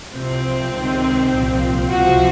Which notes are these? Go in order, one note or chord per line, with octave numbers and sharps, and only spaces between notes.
C2 C3 F3 C4
C#2 C3 D#3
C2 A#2 F3
C#2 C3 F3 F#4